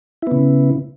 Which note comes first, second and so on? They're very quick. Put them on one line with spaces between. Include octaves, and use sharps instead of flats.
E4 B3 C#3